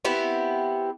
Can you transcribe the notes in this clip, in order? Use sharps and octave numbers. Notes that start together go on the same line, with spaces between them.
B3 C4 E4 G4